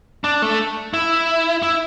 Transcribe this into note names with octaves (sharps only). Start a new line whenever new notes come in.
D4
A3
E4
E4